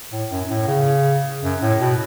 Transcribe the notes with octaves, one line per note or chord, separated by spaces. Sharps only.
A2
F#2
A2
C#3
F#2
A2
B2